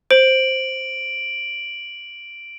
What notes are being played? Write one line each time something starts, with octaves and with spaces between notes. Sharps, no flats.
C5 D7 F#7